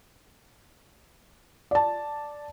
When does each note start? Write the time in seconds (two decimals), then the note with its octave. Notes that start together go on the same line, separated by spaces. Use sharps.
1.71 D5 A5